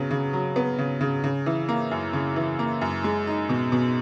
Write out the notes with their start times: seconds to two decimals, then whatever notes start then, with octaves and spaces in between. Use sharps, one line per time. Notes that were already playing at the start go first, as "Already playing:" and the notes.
Already playing: C#3 F#3 B3
0.11 C#3
0.33 F#3
0.56 B3
0.78 C#3
1.01 C#3
1.24 C#3
1.46 E3
1.68 A#3
1.91 F#2
2.13 C#3
2.36 E3
2.59 A#3
2.81 F#2
3.04 G#3
3.27 D#4
3.49 B2
3.72 B2